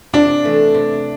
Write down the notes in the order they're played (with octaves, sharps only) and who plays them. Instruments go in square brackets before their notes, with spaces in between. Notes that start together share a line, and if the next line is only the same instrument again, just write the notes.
[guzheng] C3 [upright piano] D4
[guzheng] E3 A3
C3